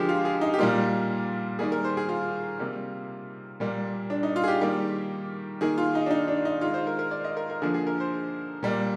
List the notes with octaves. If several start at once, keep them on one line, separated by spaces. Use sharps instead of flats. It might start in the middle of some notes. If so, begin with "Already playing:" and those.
Already playing: D3 F3 G#3 G4 G#4 A#4
F4
G#4
D#4
G4
A#2 G3 A#3 F4
D#3 G3 A#3 G#4
A#4
C5
G#4
F4
C3 G3 A#3
A#2 G3 A#3
D4
D#4
F4
G#4
G4
D#3 G3 A#3
D#3 A#3 G#4
F4
D#4
D4
D#4
D4
D#4
D#3 G#3 F4
C5
A#4
A#4
D5
D#5
A#4
A#4
D3 F3 A#3 G#4
G#4
A#4
C5
A#2 G3 A#3